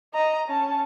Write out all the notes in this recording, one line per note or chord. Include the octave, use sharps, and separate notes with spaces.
D#5 A#5
C#4 A5